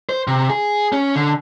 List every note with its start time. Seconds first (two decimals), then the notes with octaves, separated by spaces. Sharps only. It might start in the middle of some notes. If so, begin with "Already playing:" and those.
0.09 C5
0.28 C3
0.50 G#4
0.92 C#4
1.15 D3